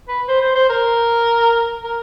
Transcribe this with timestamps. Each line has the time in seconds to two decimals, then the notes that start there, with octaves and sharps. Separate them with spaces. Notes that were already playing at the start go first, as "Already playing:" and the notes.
0.08 B4
0.28 C5
0.41 C5
0.55 C5
0.69 A#4
1.84 A#4